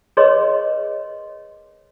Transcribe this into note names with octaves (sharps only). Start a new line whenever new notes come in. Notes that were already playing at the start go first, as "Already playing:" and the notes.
G#4 A#4 B4 C#5 D#5 C6